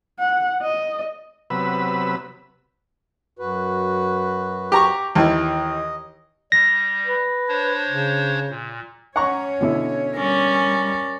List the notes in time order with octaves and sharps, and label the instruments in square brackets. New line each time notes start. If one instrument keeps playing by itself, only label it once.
[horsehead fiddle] F#5
D#5
[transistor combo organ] C3 F#3 B3 B4 B5 E6
[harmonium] F#2 F#4 B4
[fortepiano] G4 A#5 C#6
[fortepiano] D#2 E3 [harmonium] D#5
[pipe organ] G3 [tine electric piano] A#6
[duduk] B4
[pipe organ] D4 C5 C#5
[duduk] C#3
[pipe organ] A#2
[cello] C#4 C#5 [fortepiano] F#5 A#5 C#6
[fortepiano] B2 D3 E4
[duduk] G3 [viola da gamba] C#4 [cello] A#4 D5